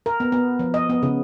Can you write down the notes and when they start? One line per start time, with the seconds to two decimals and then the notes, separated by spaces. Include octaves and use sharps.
0.06 A#4
0.20 B3
0.32 B3
0.59 F3
0.74 D#5
0.90 B3
1.03 C#3